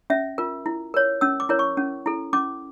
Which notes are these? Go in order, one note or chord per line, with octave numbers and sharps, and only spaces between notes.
C#4 E5
F4 A#4
E4
A#4 C#5
C#4 E6
D6
E4 A#4 C#5
C#6
C#4
E4 A4
C#4 D6